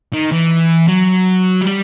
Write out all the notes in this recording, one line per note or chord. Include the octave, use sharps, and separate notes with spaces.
D#3
E3
F#3
G3